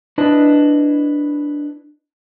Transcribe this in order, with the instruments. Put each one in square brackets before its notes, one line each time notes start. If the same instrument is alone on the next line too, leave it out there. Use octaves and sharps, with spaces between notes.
[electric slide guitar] D4 E4 B4 D#5 A5